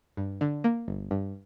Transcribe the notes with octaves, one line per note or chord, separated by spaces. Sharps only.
G2
D3
A#3
G1
G2